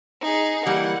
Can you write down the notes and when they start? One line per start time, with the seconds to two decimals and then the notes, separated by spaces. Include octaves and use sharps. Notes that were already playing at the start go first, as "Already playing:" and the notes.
0.21 D#4 G#4
0.66 E3 G3 A#3 F#5